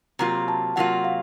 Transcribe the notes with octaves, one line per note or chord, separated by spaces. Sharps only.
C3 F#3 A#3 F4 A#5
A5
C3 F#3 A#3 F4 F#5
F5